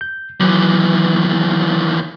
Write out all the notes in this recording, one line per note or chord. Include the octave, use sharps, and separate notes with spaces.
G6
D#2 E3 F#3